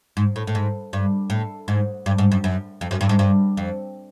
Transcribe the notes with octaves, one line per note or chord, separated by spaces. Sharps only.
G#2
A2
A2
G#2
G2
A2
G#2
G2
G#2
F#2
F#2
F2
F#2
G2
G#2
G2
F2